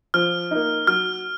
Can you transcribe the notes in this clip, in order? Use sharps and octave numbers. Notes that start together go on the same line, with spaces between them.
F3 F6
A#3 D#4
F#3 F6